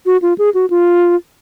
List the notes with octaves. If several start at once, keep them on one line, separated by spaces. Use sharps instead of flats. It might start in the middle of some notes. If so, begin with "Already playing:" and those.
F#4
F4
G#4
F#4
F4